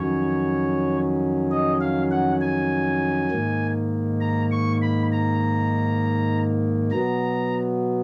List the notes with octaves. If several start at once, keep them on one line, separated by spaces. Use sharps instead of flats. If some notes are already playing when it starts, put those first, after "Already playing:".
Already playing: F2 D#3 F#3 C#4 C#5
D#5
F5
F#5
G#5
G#2 D#3 A#3
A#5
C#6
B5
A#5
B2 F#3 B3 A#5